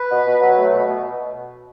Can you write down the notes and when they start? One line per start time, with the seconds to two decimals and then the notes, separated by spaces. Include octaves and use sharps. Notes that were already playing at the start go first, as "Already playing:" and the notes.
Already playing: B4
0.09 B2
0.25 B2
0.41 F#3
0.56 A3
0.72 B2
0.88 B2